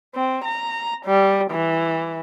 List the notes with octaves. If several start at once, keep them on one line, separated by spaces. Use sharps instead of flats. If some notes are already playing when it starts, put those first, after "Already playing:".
C4
A#5
G3
E3